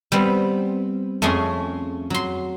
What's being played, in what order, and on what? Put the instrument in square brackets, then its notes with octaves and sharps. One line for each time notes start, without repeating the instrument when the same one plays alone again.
[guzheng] G3 B3 C4
F2 A3 C#4 G#4 C6
F#3 C6